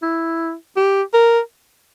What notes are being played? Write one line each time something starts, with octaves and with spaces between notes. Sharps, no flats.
E4
G4
A#4